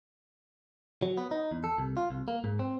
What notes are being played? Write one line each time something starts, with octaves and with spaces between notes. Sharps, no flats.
F#3
B3
D#4
E2
A4
C2
F4
C2
A#3
G#2
C4